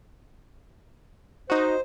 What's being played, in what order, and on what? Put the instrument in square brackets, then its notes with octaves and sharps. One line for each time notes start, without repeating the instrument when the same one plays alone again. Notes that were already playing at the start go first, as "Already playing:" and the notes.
[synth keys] D#4 F#4 [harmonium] C5